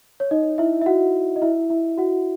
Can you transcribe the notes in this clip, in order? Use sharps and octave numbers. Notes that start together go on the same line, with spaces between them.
C#5
D#4 D#5
E4 E5
E5
F#4 F#5
D#5
E4 E5
E4 E5
F#4 F#5